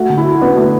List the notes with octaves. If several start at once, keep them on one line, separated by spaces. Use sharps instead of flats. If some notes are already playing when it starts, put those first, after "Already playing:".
Already playing: A3 F#4
D3
E4
F#4
B3 D4
A3